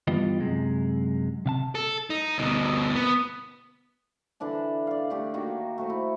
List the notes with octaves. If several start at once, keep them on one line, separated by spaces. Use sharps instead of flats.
G2 E3 B3 F4 G4 D#5
F#2 C3 G#3
C3 F5 A5
A4
D#4
D2 B2
B3
D3 E3 D4 A5
D5 F5
D3 A3 G4
D#3 A#3 D#4 F#4
A3 F#4 C5
E4